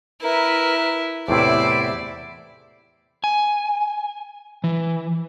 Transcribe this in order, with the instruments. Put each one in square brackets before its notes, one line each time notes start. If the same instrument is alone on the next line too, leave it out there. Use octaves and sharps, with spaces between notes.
[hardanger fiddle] E4 [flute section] A#4 B4 E5
[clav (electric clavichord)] E2 A2 C3 [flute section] E4 C5 E5 [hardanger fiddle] D5
[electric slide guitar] G#5
E3